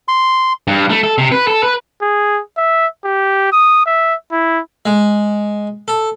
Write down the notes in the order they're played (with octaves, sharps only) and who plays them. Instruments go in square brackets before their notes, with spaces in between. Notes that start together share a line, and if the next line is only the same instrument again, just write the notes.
[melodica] C6
[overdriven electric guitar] G2
A3
A4
C3
B4
A4
B4
[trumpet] G#4
E5
G4
D#6
E5
E4
[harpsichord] G#3
A4